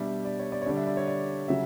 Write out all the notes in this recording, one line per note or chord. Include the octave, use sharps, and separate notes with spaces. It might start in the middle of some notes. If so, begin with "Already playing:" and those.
Already playing: B2 G3 D4 E5
D5
C#5
D5
C#5
D3 G3 D4 D5
E5
D5
C#5
D5
C#3 F#3 E5